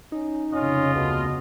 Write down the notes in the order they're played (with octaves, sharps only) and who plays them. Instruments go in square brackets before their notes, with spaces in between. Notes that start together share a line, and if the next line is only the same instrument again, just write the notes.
[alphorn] C#4 [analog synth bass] D#4
[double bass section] F1 C#3 [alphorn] C#4 [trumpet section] F4 D#5
[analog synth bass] D2 [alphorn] B2